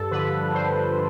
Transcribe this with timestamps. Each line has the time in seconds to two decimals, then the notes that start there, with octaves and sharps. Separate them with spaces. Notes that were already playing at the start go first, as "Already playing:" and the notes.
Already playing: G2 A4
0.11 D3 F3 B4
0.54 G2 C5